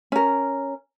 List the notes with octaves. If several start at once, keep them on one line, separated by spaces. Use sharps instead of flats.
C#4 A#4